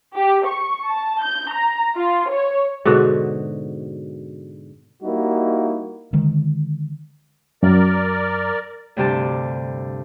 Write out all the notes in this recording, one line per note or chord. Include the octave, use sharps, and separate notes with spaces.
G4
C#6
A5
G6
A#5
F4
C#5
G#2 B2 D3 F#4
G3 A#3 D#4 E4 F#4
D3 D#3 G#3
F#2 A#4 D5
D2 G2 C3 G4 A5